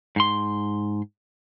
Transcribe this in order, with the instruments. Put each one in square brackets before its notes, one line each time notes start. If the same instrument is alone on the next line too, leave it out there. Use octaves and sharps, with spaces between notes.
[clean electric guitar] G#2 C6